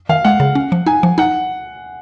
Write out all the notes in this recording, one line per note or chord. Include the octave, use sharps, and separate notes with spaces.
D#3 F5
G#3 F#5
C#3
C#4
F3
D#4 G#5
F3
D#4 F#5